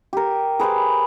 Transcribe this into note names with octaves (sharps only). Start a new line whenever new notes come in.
G4 A#4
G#4 B4 C5 D6